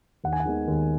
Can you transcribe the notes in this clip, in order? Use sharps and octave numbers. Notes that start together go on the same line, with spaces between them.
D#2 F#5
G#5
F#5
D#3 G#3 B3
D#2